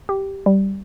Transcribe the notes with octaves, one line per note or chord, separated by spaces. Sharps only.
G4
G3